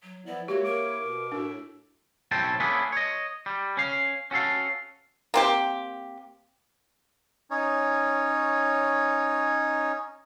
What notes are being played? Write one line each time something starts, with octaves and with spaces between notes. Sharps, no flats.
F#3
F3 B3 E4 D5
G#3 A#3 E4 F#4 G4 C#5
A#4 D6
B2
A2 D4 F#4 E5
B1 A2 C4 C#4 G5 A5
A#3 B3 C#4 D4 E4 G#4
C#5 D#5
G3
C#4 F5
C#4 F#4 A4 F5
A#3 C4 G4
C#4 D#4 C#5